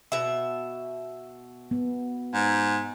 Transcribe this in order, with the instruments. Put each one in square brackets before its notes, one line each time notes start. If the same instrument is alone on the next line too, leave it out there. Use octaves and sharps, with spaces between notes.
[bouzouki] B2 E5
[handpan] B3
[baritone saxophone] G#2